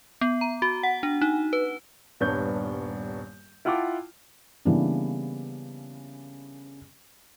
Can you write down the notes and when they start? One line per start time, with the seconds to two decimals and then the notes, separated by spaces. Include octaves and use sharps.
0.21 B3
0.41 A#5
0.62 F#4
0.83 F#5
1.03 D4
1.21 D#4
1.53 B4
2.20 D#1 G2 B3 D4 C#5 G6
3.65 E4 F4 F#5 G5 A5 D6
4.65 C#3 E3 G3 A#3 B3 D4